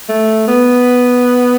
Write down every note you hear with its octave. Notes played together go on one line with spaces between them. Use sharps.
A3
B3